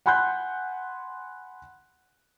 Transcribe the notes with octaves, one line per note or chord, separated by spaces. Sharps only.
F#5 G#5 B5 C6 F#6 G6